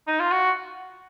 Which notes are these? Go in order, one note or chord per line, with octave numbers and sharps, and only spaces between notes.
D#4
F4
F#4